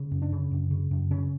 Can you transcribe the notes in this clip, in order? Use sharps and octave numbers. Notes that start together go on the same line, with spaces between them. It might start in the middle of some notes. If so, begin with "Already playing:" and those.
Already playing: C#3
F#2
D4
C#3
F#2
C#3
F#2
C#3 C#4